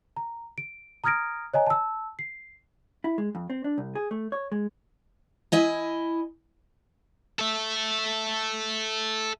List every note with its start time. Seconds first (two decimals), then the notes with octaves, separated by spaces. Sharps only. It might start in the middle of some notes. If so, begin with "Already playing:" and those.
0.17 A#5
0.58 D7
1.04 A#5 D#6 F6 G#6 A#6 D7
1.54 C#5 D#5 G#5 A#5
1.66 A5 E6
2.19 C7
3.04 E4
3.18 G#3
3.35 F2
3.50 C4
3.64 D4
3.78 C2
3.95 G#4
4.11 A3
4.32 C#5
4.52 G#3
5.52 E4 D#5 G#5
7.39 A4 E5